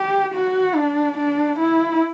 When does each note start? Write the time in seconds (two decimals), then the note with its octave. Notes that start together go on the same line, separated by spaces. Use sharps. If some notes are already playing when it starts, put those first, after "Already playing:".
Already playing: G4
0.35 F#4
0.76 D4
1.18 D4
1.60 E4